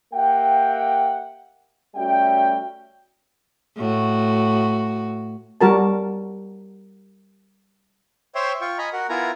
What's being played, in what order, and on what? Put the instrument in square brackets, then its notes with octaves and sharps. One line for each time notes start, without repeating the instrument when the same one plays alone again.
[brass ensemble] A#3 G4 E5 F#5 G5
G3 A3 C#4 F#4 E5 G5
[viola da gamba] A2 F#4
[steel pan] G3 F#4 A#4 A5
[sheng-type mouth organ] C5 C#5 E5 G5 C6
F4 G5 C#6
D#5 G#5 A#5 B5
F#4 A#4 F#5
B3 E4 F4 A#4 G#5 A#5